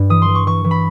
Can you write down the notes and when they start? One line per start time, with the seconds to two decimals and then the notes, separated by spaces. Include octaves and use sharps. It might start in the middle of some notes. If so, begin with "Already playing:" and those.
Already playing: G2
0.10 E3 D#6
0.22 C6
0.28 E3
0.35 C#6
0.47 E3 C#6
0.64 E3
0.71 B5